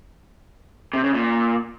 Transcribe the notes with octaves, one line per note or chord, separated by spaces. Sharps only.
C3
C#3
A#2